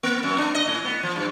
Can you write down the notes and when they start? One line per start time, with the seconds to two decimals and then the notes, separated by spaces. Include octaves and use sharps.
0.03 A#3
0.23 F#2
0.38 D4
0.54 D#5
0.67 A2
0.84 B3
1.03 F3
1.16 G2